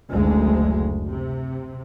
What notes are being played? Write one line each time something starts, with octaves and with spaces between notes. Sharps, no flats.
F#1 D2 G#3
C3